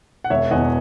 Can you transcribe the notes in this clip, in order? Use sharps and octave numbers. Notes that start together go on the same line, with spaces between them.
F#5
E1 C#5 E5
E2 B2 D#5 F#5